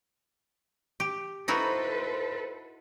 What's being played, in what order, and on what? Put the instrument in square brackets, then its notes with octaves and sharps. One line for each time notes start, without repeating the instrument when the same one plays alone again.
[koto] G4
[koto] D#4 E4 F#4 [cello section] A4 B4 C5